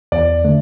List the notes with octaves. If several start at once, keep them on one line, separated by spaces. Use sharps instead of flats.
E2 D5
D3 A3